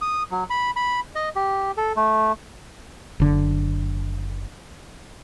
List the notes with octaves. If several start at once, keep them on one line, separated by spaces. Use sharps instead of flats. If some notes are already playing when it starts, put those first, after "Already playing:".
D#6
F#3
B5
B5
D#5
G4
A4
A3
F#1 D3